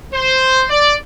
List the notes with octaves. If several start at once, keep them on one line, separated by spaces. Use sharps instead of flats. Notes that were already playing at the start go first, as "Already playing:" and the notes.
C5
D5